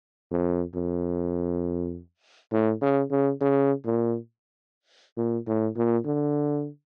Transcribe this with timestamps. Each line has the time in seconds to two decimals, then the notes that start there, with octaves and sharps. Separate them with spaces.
0.31 F2
0.75 F2
2.52 A2
2.82 C#3
3.11 C#3
3.41 C#3
3.85 A#2
5.17 A#2
5.47 A2
5.77 A#2
6.06 D3